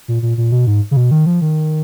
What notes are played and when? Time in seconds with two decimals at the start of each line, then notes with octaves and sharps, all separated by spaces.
0.08 A#2
0.22 A#2
0.37 A#2
0.52 B2
0.67 G#2
0.91 C#3
0.97 B2
1.11 D#3
1.26 F3
1.42 D#3